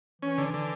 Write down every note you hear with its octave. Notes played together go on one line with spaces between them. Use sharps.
E3 C#4
D3
D3